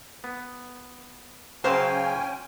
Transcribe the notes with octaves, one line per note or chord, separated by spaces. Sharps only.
B3
C#3 F#3 C#4 C5 F5 G5 G#5 C6